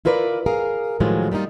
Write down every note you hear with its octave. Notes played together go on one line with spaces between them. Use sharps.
E4 F4 A#4 B4 C#5 D5
G#4 A#4 F5
A2 D#3 F3 F#3 G#3 F4
G3 A#3 B3 D#4 F4